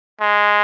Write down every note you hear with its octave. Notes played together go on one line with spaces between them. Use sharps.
G#3